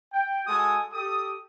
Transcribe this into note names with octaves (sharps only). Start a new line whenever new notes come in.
G5
G#3 F#4 A4 G#5 D#6
G4 A4 D#6